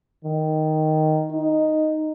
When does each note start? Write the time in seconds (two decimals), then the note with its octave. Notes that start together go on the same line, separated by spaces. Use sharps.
0.24 D#3
1.32 D#4